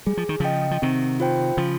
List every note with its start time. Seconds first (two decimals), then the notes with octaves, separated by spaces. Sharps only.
0.06 G3 G#4
0.17 F3
0.29 D#3
0.40 C#3 F3 D#5 G5
0.71 F3
0.82 C3 D#3 C4
1.20 F4 C5 G5
1.57 C#3 F3 F4